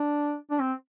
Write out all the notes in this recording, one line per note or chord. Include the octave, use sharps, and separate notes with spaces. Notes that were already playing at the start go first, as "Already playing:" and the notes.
Already playing: D4
D4
C4